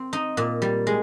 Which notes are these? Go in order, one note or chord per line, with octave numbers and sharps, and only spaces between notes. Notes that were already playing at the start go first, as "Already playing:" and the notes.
Already playing: C4
D#4
A#2
G3
G#3